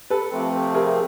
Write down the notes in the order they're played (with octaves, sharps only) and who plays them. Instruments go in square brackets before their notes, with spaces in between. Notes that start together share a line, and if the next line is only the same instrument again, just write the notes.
[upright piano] A4 B4
[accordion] C3 F3 A3 C4
[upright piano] G#4 A#4